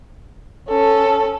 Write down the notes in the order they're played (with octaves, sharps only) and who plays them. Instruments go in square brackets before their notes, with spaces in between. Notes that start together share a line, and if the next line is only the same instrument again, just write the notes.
[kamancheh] C#4 A4